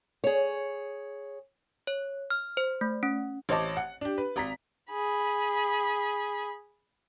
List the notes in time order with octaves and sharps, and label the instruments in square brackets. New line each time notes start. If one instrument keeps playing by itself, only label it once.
[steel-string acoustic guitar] G#4 C#5
[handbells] C#5
F6
C5
A3
C#4
[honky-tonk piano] A1 C5 C#5 D#5 A5 D6
F#5
D4 G4
B4
G#1 A#5 B6
[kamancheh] G#4 B5